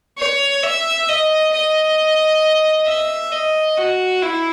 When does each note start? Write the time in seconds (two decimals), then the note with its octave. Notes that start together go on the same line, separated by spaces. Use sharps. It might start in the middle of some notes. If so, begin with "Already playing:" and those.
0.18 C#5
0.63 E5
1.09 D#5
1.53 D#5
2.87 E5
3.32 D#5
3.77 F#4
4.22 E4